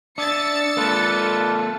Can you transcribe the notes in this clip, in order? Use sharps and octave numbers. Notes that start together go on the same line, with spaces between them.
D4 D5 E5 D#6 E6 A6 C#7
A#3 F4 A4 B4 D5